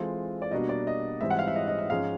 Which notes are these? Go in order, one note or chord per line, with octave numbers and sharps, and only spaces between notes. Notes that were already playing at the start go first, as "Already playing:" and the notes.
Already playing: E3 G#3 C4 F4 A4
D5
B2 G3 A#3 D4 F#4 D#5
D5
D#5
G#2 E3 G3 C4 E5
F#5
F5
E5
D#5
D#5
E5
G#2 F3 G#3 C#4 F5